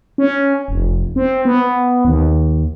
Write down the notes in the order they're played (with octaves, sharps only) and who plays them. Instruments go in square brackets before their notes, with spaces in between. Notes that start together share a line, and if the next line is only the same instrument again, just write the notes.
[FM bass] C#4
F1
C4
B3
D#2